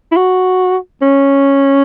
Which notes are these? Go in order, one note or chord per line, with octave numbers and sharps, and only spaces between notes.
E4
F#4
C#4